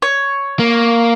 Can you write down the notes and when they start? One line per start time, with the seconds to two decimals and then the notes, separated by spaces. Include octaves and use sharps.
0.02 C#5
0.59 A#3